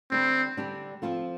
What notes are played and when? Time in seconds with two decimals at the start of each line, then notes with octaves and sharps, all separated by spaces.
0.11 D3 G3 C4 D4
0.57 D3 G3 D4
1.02 F3 C4 F4 A4